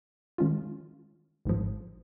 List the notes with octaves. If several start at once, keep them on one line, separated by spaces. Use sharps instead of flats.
D#3 G#3 C#4 F4
G#1 G#2 F3